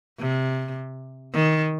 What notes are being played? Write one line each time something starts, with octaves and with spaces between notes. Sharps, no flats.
C3
D#3